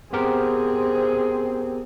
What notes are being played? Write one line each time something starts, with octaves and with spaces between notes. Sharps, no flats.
B3 C4 G4 G#4 A#4